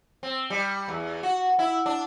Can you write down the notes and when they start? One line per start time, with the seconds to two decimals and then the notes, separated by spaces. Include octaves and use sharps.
0.23 C4
0.50 G3
0.88 E2
1.23 F#4
1.59 E4
1.86 D4